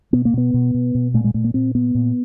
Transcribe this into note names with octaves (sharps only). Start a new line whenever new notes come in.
B2 B3
A#3
B2 B3
B2
B2
B2
A#2 A3
G#3
A#2 A3
A#3
A#2 C4
A#2 B3
A#2